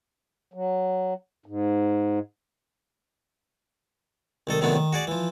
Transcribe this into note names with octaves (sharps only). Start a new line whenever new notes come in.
F#3
G#2
C2 D#3 A4 D#6
A2 C3 D#3 F#3 B3 D4
D#3
F#4 G#4 D5
E3 F3